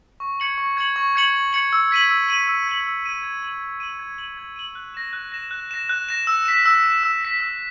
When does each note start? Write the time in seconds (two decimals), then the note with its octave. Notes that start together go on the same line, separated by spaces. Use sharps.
0.20 C#6
0.40 G#6 C#7 F#7
0.58 C#6
0.77 G#6 C#7 F#7
0.96 C#6
1.15 G#6 C#7 F#7
1.34 C#6
1.53 G#6 C#7 F#7
1.73 E6
1.91 G#6 B6 D#7 F#7
2.09 E6
2.29 G#6 B6 D#7 F#7
2.47 E6
2.67 G#6 B6 D#7 F#7
2.86 E6
3.04 G#6 B6 D#7 F#7
3.23 G#6
3.43 D#7 F#7
3.61 G#6
3.80 D#7 F#7
3.99 G#6
4.18 D#7 F#7
4.37 G#6
4.56 D#7 F#7
4.75 F#6
4.94 A#6 E7
5.13 F#6
5.32 A#6 E7
5.51 F#6
5.71 A#6 E7
5.89 F#6
6.09 A#6 E7
6.27 E6
6.46 B6 E7
6.66 E6
6.84 B6 E7
7.03 E6
7.22 B6 E7
7.40 E6